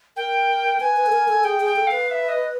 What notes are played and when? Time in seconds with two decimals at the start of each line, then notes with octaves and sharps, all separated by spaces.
0.16 A#4 G5
0.80 B4 G#5
0.97 B4
1.06 A4
1.12 A#4
1.28 A4
1.44 G#4 G5
1.60 G#4
1.66 G5
1.76 A4
1.87 B4 F5
2.08 F5
2.11 E5
2.29 D#5